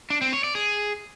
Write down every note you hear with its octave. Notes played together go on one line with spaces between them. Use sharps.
D4
C4
C#5
D5
G#4